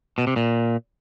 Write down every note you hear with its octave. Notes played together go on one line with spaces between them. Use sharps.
B2
C3
A#2